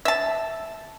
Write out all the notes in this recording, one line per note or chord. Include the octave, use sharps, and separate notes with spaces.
E5 A5